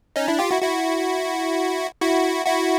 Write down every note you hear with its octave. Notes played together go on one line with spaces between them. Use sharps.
C#4 D#4
D4 E4
F4 G4
E4 F#4
E4 F#4
E4 F#4
E4 F#4